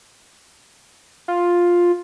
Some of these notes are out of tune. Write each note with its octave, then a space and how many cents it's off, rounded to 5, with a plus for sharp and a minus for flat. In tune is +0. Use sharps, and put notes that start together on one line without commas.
F4 +5